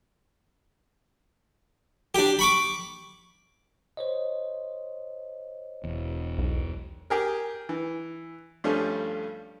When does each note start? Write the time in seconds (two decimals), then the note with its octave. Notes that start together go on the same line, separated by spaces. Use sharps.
2.15 D4 G4
2.39 B5 C#6 D6
3.97 C5 C#5 D#5
5.84 E1 E2
6.38 B1
7.10 G4 G#4 A#4
7.69 E3
8.64 G2 F3 G3 A3 C#4